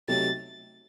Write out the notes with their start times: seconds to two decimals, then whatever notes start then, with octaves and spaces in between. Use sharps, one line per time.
0.08 C3 F#3 A3 D#4 A6